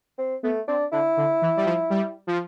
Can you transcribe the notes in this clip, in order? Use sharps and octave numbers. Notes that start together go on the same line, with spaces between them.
C4
A3 B3
C4 D4
D3 E4
D3
E3
G3
F3
G3
F3